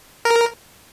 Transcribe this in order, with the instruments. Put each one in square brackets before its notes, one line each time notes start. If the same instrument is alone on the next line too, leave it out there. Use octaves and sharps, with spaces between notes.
[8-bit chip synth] A#4